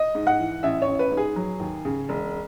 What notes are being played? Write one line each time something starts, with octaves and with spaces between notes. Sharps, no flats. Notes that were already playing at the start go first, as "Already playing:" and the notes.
Already playing: D#5
G#2
F#5
E3
A1 E5
C#5
A1
B4
G#2
G#4
F#3
D#2
C#3
E1